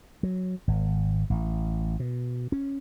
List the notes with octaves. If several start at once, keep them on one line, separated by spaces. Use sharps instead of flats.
F#3
G#1
A1
B2
C#4